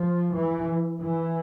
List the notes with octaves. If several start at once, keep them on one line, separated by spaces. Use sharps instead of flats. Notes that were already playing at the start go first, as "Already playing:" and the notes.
Already playing: F3
E3
E3